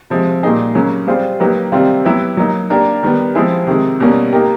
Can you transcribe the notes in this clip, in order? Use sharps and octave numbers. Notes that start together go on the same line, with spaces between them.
C3 F3 G#3
A#2 G3 A#3 D#4 G#4
C#3 F#3 A#3 C#4
G3 C4 F4 G#4 C5
F#3 A#3 D#4 G4 B4
C3 D#3 G3 C4 F4
F#3 B3 E4 G4
F#3 A#3 D#4
A#3 D4 G4 A#4
D#3 G3 B3
F3 G#3 C4 E4 G#4
C3 D#3 G#3
B2 G3 A#3 C#4
A#3 D#4 G4 A#4